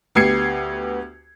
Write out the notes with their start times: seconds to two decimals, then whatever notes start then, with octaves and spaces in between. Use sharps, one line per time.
0.15 D2 B3 G4 G#6 C7 C#7